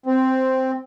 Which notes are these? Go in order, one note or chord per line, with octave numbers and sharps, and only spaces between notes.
C4